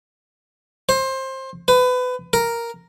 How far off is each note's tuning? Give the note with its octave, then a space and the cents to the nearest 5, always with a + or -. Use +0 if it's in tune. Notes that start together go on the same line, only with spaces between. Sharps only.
C5 +20
B4 +25
A#4 +0